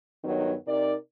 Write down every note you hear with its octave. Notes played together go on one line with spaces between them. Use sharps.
G2 D#3 F#3 B3 C#5
C3 D#4 A#4 D5